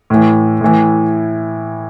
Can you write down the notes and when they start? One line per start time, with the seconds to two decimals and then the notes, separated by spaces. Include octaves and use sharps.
0.10 A2 E3
0.61 A2 E3